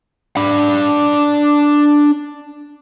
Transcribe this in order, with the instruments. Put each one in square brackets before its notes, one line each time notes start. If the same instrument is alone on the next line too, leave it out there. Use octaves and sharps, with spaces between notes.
[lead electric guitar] D4 B5